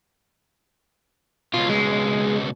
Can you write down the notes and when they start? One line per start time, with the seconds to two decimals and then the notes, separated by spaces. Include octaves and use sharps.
1.54 C#2 B2 F4
1.70 G#3